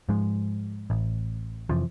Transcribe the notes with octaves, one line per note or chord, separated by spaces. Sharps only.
G#2 F3 G#3
A1
F2 C3 E3 F3